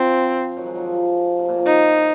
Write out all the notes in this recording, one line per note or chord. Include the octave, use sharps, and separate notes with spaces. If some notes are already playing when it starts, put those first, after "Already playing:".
Already playing: F3 C4
D#3 F#3
F3 G#3
D#3 F#3
F3
C3
C3
A#2
C3
D#3 D#4